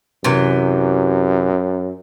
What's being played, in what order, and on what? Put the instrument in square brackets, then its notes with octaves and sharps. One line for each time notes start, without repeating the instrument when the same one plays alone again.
[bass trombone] F#2 [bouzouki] C3 E3